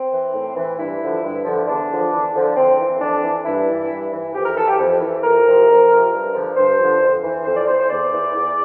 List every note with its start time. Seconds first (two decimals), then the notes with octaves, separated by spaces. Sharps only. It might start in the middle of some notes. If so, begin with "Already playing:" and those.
Already playing: C4
0.12 E3
0.34 A2
0.57 E3
0.78 G2 E4
1.01 D3 F3
1.24 G2
1.45 D3 F3
1.67 E2 D4
1.90 D3 F3
2.12 E2
2.35 D3 F3
2.57 F2 C4
2.79 E3
3.01 F2 D4
3.23 E3
3.45 G2 E4
3.68 E3
3.90 G2
4.13 E3
4.34 F2 G4
4.46 A#4
4.56 E3 A4
4.68 G4
4.79 F2
5.01 E3
5.24 F2 A#4
5.45 C3 F3
5.69 F2
5.90 C3 F3
6.12 G2
6.34 D3 F3
6.57 G2 C5
6.79 D3 F3
7.02 F2
7.24 E3
7.45 F2 C5
7.57 D5
7.68 E3 C5
7.79 C5
7.90 E2 D5
8.13 E3
8.35 E2